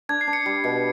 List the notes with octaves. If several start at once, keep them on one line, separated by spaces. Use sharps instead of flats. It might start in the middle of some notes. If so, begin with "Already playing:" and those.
D4 G#6
C7
D4
C#7
G3
B2